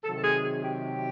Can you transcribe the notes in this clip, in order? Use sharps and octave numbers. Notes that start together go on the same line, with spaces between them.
C3 D#3 F#3 A4
A4
G#4
G#4
G4